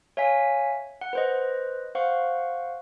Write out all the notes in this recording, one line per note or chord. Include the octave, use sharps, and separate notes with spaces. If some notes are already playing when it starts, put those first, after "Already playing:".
C#5 E5 F5 G#5 B6
F#5
B4 C5 D#5
C5 F5 F#5 C#6